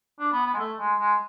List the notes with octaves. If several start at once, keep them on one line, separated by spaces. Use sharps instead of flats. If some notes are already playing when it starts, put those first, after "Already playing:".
D4
B3
B3
G#3
A3
G#3
G#3